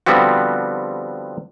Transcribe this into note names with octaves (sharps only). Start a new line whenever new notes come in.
D3 F3 G3 B3 C4 F#4